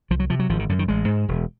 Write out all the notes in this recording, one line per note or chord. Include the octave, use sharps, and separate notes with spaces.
C2 F3
F#3
C3 F3
F#3
G#1 F3
D#3
F#2 D3
D#3
A1 G#3
G#2
E1